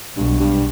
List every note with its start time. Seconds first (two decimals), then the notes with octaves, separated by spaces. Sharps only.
0.16 B1 G2 B2
0.40 G2